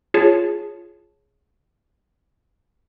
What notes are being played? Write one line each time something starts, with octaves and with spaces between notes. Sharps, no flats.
F4 G#4 C#5 A5